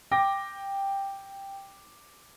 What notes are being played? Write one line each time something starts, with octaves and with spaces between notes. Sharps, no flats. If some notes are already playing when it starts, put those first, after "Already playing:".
G5 D6 A#6